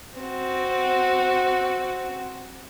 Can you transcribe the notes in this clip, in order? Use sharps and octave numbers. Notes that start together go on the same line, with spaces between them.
C4 F#4